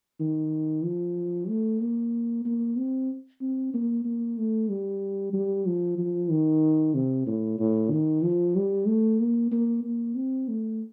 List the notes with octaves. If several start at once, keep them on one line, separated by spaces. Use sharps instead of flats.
D#3
F3
A3
A#3
A#3
C4
C4
A#3
A#3
A3
G3
G3
F3
F3
D#3
C3
A2
A2
D#3
F3
G3
A3
A#3
A#3
A#3
C4
A3